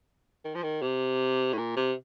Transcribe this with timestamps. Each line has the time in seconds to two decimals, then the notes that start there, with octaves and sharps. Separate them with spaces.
0.44 D#3
0.55 F3
0.63 D#3
0.82 C3
1.53 A2
1.58 A#2
1.76 C3